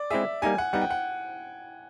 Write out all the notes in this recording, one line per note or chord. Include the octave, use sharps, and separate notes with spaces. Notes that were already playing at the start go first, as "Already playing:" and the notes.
Already playing: D5
G#3 C4 E4 G#4 E5
G3 A#3 D#4 G4 G#5
F#5
G3 B3 D#4 F#5
G5
F#5